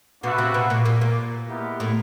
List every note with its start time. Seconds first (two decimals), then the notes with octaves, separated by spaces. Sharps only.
0.23 B2 A#3 B3 D4 F#4 B4 E5
0.38 C3 C4
0.54 B2 B3
0.70 A#2 A#3
0.85 A#2 A#3
1.01 A#2 A#3
1.48 G#3 B3 E4 G4 A#4
1.80 A2 A3